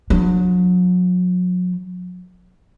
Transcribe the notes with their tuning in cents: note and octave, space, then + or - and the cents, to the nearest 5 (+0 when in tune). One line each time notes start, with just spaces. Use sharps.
F#3 -35 D4 +0